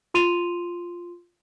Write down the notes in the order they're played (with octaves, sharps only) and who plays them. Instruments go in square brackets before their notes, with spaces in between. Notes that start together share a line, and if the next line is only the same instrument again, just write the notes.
[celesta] F4 C6 D#7 F7